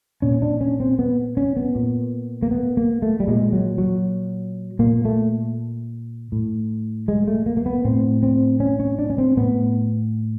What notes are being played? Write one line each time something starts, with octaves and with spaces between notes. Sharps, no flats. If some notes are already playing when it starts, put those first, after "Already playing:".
A#2 C#4
D4
C#4
C4
B3
C#4
B3
A#2
A#3
B3
A#3
A3
G3
A#2 G#3
F#3
F#3
A#2 A#3
A3
A2
G#3
A3
A#3
A#3
B3
A2 C4
C4
C#4
C#4
D4
C#4
C4
A2 B3